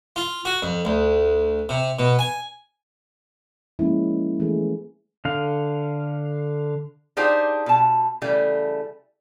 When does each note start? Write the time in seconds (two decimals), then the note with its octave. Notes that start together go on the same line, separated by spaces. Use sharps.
0.16 F4
0.45 F#4
0.63 F2
0.85 D2
1.69 C3
1.99 B2
2.19 G#5
3.79 F3 G#3 A#3 C#4 E4
4.40 E3 A3 B3 G#4
5.25 D3 F5
7.17 D4 D#4 F4 G4 G#4 C5
7.66 B2 A5
8.22 C#3 E3 G3 A3